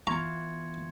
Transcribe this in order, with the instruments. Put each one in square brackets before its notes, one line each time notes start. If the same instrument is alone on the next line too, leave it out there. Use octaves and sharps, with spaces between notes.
[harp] E3 B3 F4 [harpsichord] A#5 [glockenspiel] C6 G#6 C#7 [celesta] C#6